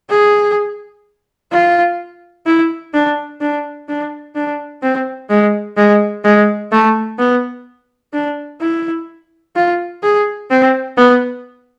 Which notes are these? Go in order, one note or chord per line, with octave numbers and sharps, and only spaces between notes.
G#4
F4
E4
D4
D4
D4
D4
C4
G#3
G#3
G#3
A3
B3
D4
E4
F4
G#4
C4
B3